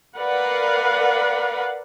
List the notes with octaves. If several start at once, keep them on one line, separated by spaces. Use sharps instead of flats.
A#4 B4 D5 F5 F#5